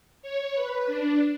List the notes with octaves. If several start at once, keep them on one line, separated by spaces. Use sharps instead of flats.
C#5
B4
D4